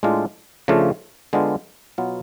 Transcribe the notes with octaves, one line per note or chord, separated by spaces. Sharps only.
A2 G#3 D4 F4
C#3 F3 A3 D4 F4
D3 G#3 B3 D4 F4
B2 F#3 B3 F4